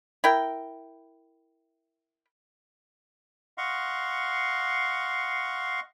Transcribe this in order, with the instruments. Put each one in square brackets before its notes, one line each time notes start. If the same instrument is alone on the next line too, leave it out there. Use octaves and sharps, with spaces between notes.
[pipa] E4 A#4 G5
[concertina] D#5 F5 F#5 C6 C#6